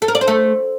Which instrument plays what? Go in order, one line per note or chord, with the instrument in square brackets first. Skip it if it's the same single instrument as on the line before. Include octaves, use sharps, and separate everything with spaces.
[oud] A4
A#4
D5
C5
A3